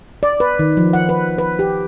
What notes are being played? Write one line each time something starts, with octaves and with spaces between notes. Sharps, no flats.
D5
B4
D#3
F3
F#5
B4
B4
G4